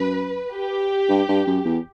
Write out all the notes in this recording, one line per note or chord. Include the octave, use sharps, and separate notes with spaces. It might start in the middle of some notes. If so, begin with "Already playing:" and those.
Already playing: F#2 B4
G4
G2
G2
F#2
E2